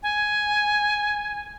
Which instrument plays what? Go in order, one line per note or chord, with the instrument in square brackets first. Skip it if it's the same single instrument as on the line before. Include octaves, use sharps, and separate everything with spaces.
[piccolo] G#5